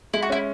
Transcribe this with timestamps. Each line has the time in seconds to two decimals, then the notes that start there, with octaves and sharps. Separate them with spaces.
0.14 G#3 E4
0.22 F#4
0.30 C#4 E4